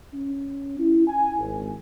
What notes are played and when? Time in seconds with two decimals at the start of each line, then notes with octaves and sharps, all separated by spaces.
0.13 C#4
0.79 E4
1.08 G#5
1.38 G#1